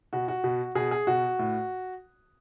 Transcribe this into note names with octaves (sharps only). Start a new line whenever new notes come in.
B2 F#4
F#4
B2
B2 G#4
G#4
B2 F#4
A2